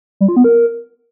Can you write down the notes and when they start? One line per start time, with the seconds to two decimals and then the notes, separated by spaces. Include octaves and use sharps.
0.21 G3
0.28 F4
0.36 B3
0.44 A#4